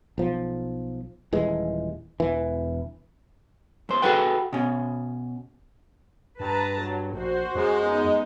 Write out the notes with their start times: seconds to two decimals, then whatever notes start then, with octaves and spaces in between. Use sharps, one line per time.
0.18 B1 F3
1.33 D#1 E3 G#3
2.20 E1 E3
3.89 F#2 C5
4.02 F#4 G#4 A4 B4 F#5 G5
4.53 B2 C#4
6.40 G2 B4 A5 A#5
6.81 F#3
7.14 A#1 F#4 C5
7.55 F#2 G#3
7.86 B3 D#4